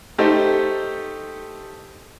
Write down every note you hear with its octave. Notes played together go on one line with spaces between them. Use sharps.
A3 D#4 G4 A4 C5